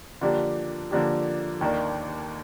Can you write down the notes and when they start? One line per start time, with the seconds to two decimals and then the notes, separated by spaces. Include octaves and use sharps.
0.21 D3 F3 A#3 D4 G4
0.91 D3 F3 A#3 D4 G4
1.61 D#2 D#3 A#3 D4